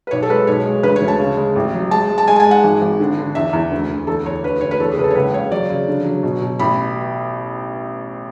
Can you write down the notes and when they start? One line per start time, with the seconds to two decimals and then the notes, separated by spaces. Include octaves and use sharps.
0.07 B4
0.11 B1 C#5
0.23 A4
0.30 G#3 B4
0.47 B1 C#5
0.66 G#3
0.83 D2 B4
0.96 C#5
1.01 D2
1.08 A5
1.20 C#3
1.37 G#3
1.56 A1
1.74 F#3
1.91 G#3 A5
2.10 G#3
2.18 A5
2.28 G#3 G#5
2.36 A5
2.40 G#5
2.46 G#3
2.51 F#5
2.64 G#1
2.82 G#1
3.00 D3
3.18 D3
3.35 E2 E5
3.53 E2
3.71 D2
3.89 D2
4.07 E2 A4
4.25 E2 C#5
4.44 D2 B4
4.61 D2 C#5
4.71 B4
4.80 E2 A4
4.91 G#4
4.97 F#1 B4
5.04 A4
5.11 C#5
5.15 C#2 B4
5.33 C#3 C#5
5.51 F#3 D5
5.70 C#3
5.87 D3
6.05 F#3
6.23 B2
6.42 B2
6.59 A1 B5